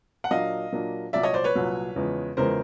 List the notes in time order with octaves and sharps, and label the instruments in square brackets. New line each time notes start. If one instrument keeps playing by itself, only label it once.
[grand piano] F#5
[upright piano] A#2 F#3 A#3 D4 [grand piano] D#5 F5
[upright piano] A#2 F#3 A#3 D4
[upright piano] C2 A#2 F#3 [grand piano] D5 E5
[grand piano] C#5 D#5
C5 D5
B4 C#5
[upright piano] C2 A#2 F#3
E2 C#3 F3 G#3
[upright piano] E2 C#3 F3 G#3 [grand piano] A#4 C5